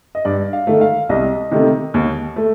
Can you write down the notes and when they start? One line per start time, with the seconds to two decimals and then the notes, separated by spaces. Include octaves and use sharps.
0.15 D#5
0.25 G2 D5
0.53 F5
0.67 D#3 A3
0.81 F5
1.09 C2 D#5
1.51 C3 D#3 A3
1.94 D#2
2.36 A3